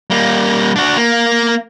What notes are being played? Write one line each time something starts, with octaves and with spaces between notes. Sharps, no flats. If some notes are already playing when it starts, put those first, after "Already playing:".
G3 A#3
D4 F#4
A#3